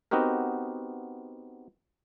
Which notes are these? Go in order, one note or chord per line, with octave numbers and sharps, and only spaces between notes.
B3 C4 D#4 F#4 G4 A#4